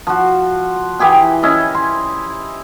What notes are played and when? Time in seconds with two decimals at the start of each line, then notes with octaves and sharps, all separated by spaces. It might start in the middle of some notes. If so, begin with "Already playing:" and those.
0.07 F3 F#4
0.99 E3 G4 G#4 G5
1.43 C#4 E4 D#5
1.74 C6